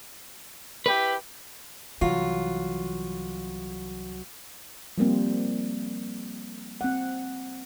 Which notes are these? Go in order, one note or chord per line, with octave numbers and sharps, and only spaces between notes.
E4 G4 B4
C2 E3 F#3 F4 F#4
F3 G3 A#3 C4
C4 F#5